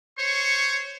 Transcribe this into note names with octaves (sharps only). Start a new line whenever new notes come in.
C5 C#5 C#6